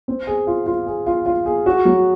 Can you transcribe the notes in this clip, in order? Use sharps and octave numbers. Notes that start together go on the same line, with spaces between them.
C4
G#4
F4
F4
G#4
F4
F4
G#4
F#4
F#3